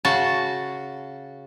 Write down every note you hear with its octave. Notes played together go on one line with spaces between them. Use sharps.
C#3 F#4 A5